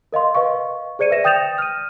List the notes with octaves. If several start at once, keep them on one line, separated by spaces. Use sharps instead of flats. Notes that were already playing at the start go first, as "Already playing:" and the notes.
A#4 D#5 F5 C6
B4 D#5 F5 C#6
G#4 C5 D5 C#7 D#7
B4 E5 A#6 E7
G5 D#6 G6 A6 E7 F7
F6 D#7